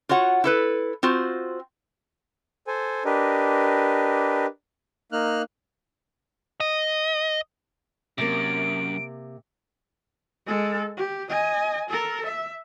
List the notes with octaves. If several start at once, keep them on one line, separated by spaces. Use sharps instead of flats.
F4 F#4 C#5 F#5
E4 A4 B4
C4 F4 F#4 C5
A4 C5 G#5
D4 G4 A#4 B4 D#5
A#3 D#4 F6 F#6
D#5
F#2 C3 A#3 D7
G#3 A4
G4
D#5 G#5
A4 A#4
E5